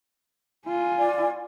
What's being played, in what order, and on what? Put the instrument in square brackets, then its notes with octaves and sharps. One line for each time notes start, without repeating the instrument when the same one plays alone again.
[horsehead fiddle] F4 G#5
[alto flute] D5